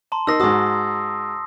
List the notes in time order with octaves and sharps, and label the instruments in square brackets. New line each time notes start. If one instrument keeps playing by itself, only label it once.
[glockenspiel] A5 A#5 C6
[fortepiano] D#4 A#4 D#6 [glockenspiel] E6 A#6 C7
[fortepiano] G#2 F#4 [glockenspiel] C6 D#6 E6